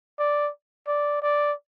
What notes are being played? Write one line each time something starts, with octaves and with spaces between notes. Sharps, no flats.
D5
D5
D5